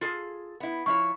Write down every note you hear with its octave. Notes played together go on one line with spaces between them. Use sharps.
F4 G#4 A4
B3 E4
F3 E4 C#5 C#6